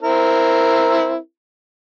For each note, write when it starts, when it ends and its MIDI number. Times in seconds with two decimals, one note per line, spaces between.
0.02 1.17 60
0.02 1.17 64
0.02 1.17 70